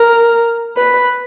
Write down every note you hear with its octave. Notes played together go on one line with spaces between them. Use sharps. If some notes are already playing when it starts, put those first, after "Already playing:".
Already playing: A#4
B4